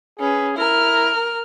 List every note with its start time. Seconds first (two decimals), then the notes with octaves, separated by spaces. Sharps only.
0.19 C#4 G#4 B4
0.57 E4 A#4 F6